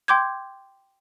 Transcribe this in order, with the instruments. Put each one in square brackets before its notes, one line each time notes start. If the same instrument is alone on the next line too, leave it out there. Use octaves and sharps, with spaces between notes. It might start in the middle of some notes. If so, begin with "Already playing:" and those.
[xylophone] G5 C6 D6 G6 G#6